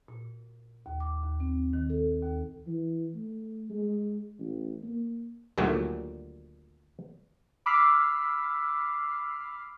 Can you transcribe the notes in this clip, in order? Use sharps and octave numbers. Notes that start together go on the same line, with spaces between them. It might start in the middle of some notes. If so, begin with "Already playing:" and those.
A#2
D#2
D6
D#2
C4
D#3
A4
D#2
E3
A3
G#3
A1
A#3
D2 A#2 D#3 F#3 G3 A3
B5 D6 E6 F6 B6 C7